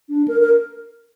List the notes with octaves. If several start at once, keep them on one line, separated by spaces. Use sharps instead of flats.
D4
A#4
A#4